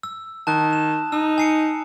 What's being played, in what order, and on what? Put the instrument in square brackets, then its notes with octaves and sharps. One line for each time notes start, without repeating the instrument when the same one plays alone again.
[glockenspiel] E6
[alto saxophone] D#3 [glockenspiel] A5 F#6
[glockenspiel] E7
[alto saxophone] D#4 [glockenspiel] E6
[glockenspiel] G#5 C7 C#7